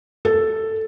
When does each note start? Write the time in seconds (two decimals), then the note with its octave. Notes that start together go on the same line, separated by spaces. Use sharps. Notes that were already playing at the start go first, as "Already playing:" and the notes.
0.25 A4